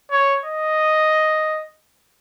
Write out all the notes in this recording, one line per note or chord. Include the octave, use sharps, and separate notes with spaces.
C#5
D#5